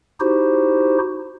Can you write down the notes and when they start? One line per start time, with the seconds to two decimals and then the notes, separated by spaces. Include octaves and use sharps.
0.20 D#4 E4 F#4 G4 C5